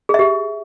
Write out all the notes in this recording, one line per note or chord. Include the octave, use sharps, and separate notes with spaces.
G4 G#4 E5